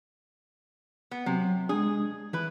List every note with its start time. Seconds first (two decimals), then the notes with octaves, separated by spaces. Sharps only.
1.11 B3
1.26 C3 F#3
1.69 G#3 D4 G#4
2.33 E3 E4 B4